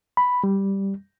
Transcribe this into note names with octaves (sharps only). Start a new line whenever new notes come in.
B5
G3